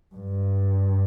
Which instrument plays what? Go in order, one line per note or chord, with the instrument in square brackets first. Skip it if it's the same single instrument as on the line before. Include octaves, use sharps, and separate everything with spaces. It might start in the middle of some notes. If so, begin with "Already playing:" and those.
[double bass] G2